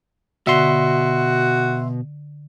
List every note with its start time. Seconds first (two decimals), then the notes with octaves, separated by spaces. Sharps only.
0.47 B2 D3 F#4 E5 C6